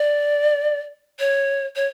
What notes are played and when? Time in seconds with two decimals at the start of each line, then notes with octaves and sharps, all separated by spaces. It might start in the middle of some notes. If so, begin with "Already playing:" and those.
Already playing: D5
1.20 C#5
1.76 C#5